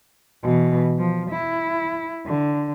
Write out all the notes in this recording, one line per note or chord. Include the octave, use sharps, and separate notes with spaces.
B2 E3
F3
E4
D3